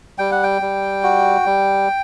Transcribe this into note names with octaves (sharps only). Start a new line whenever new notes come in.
G3 G5
F#5
G5
G3
F#4
G3